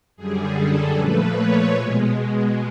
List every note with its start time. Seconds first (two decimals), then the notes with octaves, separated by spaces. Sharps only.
0.17 F#2 D3 G3 G#4
0.56 A4
0.96 A#2 F3 A3 B4
1.34 C#5
1.74 B2 G#3